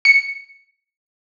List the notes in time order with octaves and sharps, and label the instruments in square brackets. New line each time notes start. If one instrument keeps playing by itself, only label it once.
[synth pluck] C#7